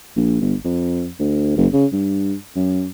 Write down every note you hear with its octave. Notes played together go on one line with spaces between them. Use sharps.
A#1
G1
F2
D2
F#1
C#3
G2
F#2